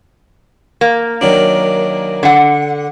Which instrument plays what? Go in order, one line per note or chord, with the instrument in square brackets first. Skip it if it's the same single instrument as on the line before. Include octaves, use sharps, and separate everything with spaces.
[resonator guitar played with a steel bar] A#3
[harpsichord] D#3 F#3 D4
[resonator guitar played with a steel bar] D3 F#5